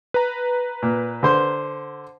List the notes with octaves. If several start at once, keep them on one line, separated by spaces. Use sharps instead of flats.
B4 A#5
A#2
D3 C5 C6